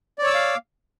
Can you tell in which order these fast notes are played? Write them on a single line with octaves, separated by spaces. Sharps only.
D5 C#5 E6 D6 F5